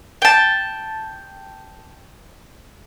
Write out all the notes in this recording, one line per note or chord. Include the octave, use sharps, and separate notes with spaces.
G5 A5